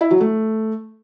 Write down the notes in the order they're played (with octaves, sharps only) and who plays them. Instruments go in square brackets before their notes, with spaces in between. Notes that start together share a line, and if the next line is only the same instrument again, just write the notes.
[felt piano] E4
F#3
A3